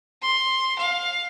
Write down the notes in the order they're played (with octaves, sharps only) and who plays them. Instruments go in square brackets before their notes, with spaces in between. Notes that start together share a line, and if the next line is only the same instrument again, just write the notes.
[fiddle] C6
F5